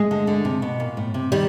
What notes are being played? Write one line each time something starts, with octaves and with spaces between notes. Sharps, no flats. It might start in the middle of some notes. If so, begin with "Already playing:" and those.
Already playing: G#3
D3
D3
C3
B2
A#2
A2
C3
D#3 G3